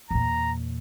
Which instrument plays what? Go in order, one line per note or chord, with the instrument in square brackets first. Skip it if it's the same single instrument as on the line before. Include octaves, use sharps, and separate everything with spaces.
[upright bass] E2 A#2 [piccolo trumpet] A#5